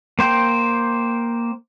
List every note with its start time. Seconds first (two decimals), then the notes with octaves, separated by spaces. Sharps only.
0.19 A#3 C5 G5